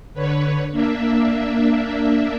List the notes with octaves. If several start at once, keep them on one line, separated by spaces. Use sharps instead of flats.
D3 B4 C#5
A#3 D4 E5